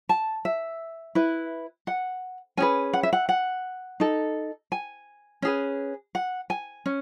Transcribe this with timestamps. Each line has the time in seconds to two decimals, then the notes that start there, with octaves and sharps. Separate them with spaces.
0.09 A5
0.45 E5
1.15 E4 B4
1.87 F#5
2.57 C#4 G#4 B4 G#5
2.93 F#5
3.03 E5
3.13 F#5
3.29 F#5
4.00 D#4 A4
4.72 G#5
5.42 C#4 G#4 B4
6.15 F#5
6.50 G#5
6.86 C#4